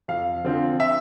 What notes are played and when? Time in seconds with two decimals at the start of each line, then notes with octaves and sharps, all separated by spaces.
0.08 F2 F5
0.44 D3 F3 C4
0.80 E5